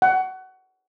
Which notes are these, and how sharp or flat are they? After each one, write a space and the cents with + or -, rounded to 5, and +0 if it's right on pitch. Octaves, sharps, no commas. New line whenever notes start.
F#5 +25